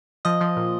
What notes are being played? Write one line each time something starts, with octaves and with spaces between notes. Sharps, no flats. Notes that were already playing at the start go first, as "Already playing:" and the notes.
F3 D#5
F3
A#2